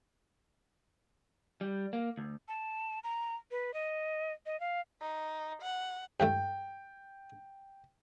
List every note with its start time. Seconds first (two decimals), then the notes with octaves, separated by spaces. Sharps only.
1.61 G3
1.93 A#3
2.18 D2
2.48 A5
3.04 A#5
3.51 B4
3.74 D#5
4.46 D#5
4.60 F5
5.01 D#4
5.62 F#5
6.20 G2 E3 A3 G5